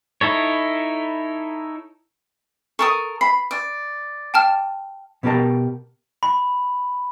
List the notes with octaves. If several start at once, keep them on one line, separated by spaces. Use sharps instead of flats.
D#4 E4 A4 C#5
A4 A#4 C#6 D#6
B5 C7
D5
G5 A5 F6
B2 B3 C#4 G4 A#4 A5
B5